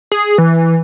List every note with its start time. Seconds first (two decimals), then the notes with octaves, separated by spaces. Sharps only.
0.12 G#4
0.38 E3